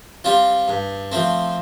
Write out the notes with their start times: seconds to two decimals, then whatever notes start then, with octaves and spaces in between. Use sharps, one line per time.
0.24 G3 C4 F4
0.68 G2
1.12 F3 A3 C4